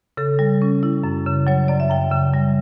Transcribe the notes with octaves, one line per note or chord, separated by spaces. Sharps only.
C#3 A4
G3
C#4
E4
F#2
C#3
F#3 C#5
F#2 D5
E5
F#2 G5
C#3
G3